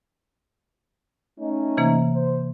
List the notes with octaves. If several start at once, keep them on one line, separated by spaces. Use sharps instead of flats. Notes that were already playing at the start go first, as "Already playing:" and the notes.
A3 C#4 D#4
C3 E3 A#3
C5